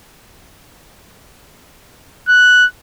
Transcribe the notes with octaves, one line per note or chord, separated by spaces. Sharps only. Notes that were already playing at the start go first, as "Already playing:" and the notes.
F#6